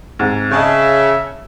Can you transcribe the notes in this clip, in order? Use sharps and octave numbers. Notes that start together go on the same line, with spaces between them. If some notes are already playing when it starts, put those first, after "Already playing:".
G#2 C3
C#3 D#5 E5 A5 C#6